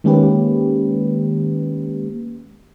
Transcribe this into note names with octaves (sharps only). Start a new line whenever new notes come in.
D#3 G#3 A#3 C#4 G4 B4